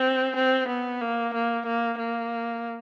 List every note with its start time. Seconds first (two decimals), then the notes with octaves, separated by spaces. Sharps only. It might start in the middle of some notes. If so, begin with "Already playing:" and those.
Already playing: C4
0.36 C4
0.68 B3
1.01 A#3
1.34 A#3
1.66 A#3
1.98 A#3